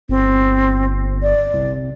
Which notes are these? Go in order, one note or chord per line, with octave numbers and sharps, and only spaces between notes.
G1 C4
D5
C2